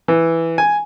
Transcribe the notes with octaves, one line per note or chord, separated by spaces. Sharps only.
E3
G#5